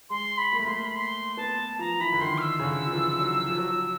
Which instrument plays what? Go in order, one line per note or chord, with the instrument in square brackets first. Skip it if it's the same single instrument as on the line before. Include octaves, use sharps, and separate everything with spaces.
[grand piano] G#3 [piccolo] C6
[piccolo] B5
[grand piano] A#3
[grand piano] A3 [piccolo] B5
[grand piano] A#3 [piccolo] C6
[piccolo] B5
C6
[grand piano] B3 [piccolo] A5
[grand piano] F3 [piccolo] A#5
[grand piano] E3 [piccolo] B5
[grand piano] D3
[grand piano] D#3 [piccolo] C6
[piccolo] F6
E6
[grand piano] C#3
D3
F3
E3
F#3
F3
F#3
F3